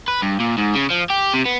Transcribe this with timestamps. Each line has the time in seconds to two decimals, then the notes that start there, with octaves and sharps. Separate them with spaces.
0.08 B4
0.22 G2
0.40 A#2
0.58 G#2
0.75 C#3
0.91 F3
1.10 G4
1.34 C3
1.46 B3